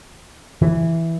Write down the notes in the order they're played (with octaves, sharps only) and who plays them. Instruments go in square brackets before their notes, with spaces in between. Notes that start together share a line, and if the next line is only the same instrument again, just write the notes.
[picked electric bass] E3